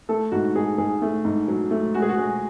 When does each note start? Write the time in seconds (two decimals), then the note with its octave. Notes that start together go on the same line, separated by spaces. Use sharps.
0.09 A3 A4
0.32 G#2 F#4
0.56 G#2 G#4
0.78 G#2 G#4
1.02 A3
1.25 G#2
1.48 F#3
1.71 A3
1.94 G#3 F#4
2.02 G#4
2.09 F#4
2.18 G#3